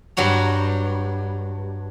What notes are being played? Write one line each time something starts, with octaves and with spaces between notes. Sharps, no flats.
G2 F#3 F#4 A#5